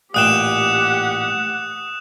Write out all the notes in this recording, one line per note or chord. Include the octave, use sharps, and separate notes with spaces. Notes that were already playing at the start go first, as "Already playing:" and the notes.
A1 A#2 G4 F#5 G5 D#6 F#6 E7